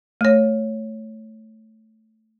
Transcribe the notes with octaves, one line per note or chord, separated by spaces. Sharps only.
A3 C#5